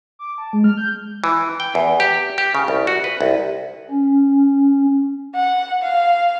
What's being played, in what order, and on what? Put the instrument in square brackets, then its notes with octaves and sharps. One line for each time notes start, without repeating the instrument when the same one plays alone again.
[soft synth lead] D6
A5
G#3
F6
G6
[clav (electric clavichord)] E3
G5
E2
G4
G4
C#3
C2
F#4
B4
C2
[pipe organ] C#4
[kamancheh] F#5
F5